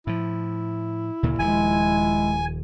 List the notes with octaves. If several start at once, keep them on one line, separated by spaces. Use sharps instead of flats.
A2 F3 E4
D2 A#2 C#3
D#1 F3 G#3 G#5